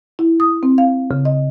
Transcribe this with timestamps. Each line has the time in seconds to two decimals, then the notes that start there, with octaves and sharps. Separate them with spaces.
0.19 E4
0.40 D#6
0.63 C4
0.78 F5
1.11 C#3
1.25 D#5